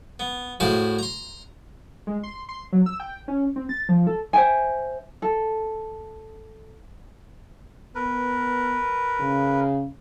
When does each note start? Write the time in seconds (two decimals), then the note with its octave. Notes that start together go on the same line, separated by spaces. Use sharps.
0.20 B3
0.60 A2 E4 F#4 G#4 C5 F5
0.99 A#5 C6
2.07 G#3
2.23 C6
2.49 C6
2.73 F#3
2.86 E6
3.00 G5
3.28 C#4
3.56 C4
3.69 A6
3.89 F3
4.07 A4
4.33 C5 E5 G5 G#5
5.22 A4
7.95 B3 A#4 B4
9.20 C#3